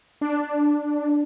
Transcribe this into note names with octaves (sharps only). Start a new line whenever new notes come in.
D4